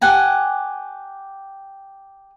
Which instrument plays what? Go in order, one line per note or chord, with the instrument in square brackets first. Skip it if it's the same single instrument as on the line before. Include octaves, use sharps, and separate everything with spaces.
[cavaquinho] G4 F#5 G#5 A5